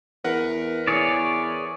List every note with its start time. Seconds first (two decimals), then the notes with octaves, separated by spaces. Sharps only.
0.24 E2 A#4 B4 F#5
0.87 E2 G#4 C#5 D5